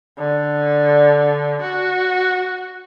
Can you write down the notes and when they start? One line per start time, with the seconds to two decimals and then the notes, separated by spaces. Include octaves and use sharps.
0.19 D3
1.63 F#4